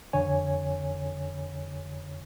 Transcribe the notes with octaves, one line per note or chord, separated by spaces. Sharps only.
F2 D3 C#5 G#5